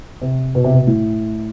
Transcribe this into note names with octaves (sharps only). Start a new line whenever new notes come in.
C3
B2
C3
B2
A2